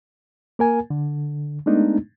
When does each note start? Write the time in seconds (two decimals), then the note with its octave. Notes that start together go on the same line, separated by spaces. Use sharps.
0.59 A#3 A#4 G#5
0.90 D3
1.66 G#3 A3 B3 D4 D#4